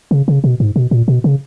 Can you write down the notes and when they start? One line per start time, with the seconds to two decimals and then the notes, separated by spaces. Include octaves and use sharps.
0.11 C#3
0.28 C#3
0.44 B2
0.60 G#2
0.76 B2
0.91 A#2
1.08 B2
1.24 C#3